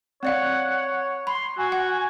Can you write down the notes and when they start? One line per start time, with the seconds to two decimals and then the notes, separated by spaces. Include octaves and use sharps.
0.23 C4 C#5 D5 F5 F#5
1.27 B5 C6
1.57 F#4 G#5
1.72 F#5